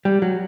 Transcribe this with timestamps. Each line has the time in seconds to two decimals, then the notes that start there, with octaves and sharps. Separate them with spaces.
0.05 G3
0.22 F#3